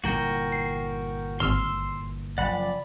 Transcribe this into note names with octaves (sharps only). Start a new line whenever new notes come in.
G1 A#2 E3 F#4 A#4 G5
C7
G#1 C6 E6 F6
F#1 F3 D5 F#5 B5